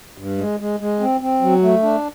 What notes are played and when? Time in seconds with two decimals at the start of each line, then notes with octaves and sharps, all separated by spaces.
0.18 G2
0.38 G#3
0.60 G#3
0.80 G#3
1.00 C4
1.21 C4
1.41 F#3
1.63 A3
1.83 D4